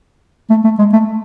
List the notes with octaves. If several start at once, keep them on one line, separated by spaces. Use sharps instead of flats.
A3
A3
G#3
A3